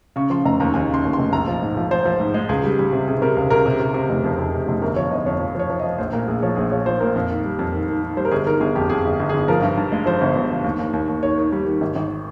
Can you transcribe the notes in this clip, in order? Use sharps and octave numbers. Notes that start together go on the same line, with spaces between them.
C#3 C#6
F3 C6
F1 A#5
D#2 A#5
D#2 G#5
C#3
C6
D#2
C6
F1
A#1 A#5
F3
G#2
F3
F3 C5
F3
G#2
G#3
C#2 G#4
G3
G3
C3
C3 G#4
C3 A#4
C#2
C#2 A#4
C3
C3
C3
F1
F2
F2
C3
F1
G1 A#4
F3 C#5
G1 D#5
F2 C#5
F3
F3 C#5
F3
D#5
F3
A#1 C5
A#2 A#4
A#1 G#4
F3 C#5
A#1 G#4
F3 C#5
F3 C5
A#2 A#4
F2
D#3
G3
F2
D#3
D#3
D#3
G3 C5
A#4
G1 G#4
D#3 A#4
G1 G#4
F2 G4
F2 G#4
G1
G1
G#4
G1
F3 A#4
G2
G2
G#3
F3 C5
G1
G1
F3
D#2
D#2
D#2
D#2
D#3 C#5
D#3
G3
D#3
G#1
G#1